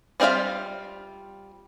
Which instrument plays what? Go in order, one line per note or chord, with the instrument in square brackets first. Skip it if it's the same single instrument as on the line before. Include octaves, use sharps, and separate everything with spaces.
[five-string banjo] G3 C4 F4 E5 F5